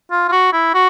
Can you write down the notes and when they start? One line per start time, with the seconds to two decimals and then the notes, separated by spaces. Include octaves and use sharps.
0.11 F4
0.28 F4
0.32 F#4
0.53 E4
0.74 F#4